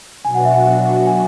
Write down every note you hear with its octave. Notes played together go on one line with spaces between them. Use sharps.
B2 F#3 B3 D4 F#4 G#5
F#5
E5
F#5
G#5